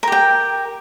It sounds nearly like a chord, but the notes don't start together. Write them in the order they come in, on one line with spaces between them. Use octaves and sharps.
A#4 G4 G5